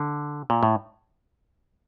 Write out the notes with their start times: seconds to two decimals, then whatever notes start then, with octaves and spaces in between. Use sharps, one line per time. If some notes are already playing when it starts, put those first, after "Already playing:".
Already playing: D3
0.50 A#2
0.63 A2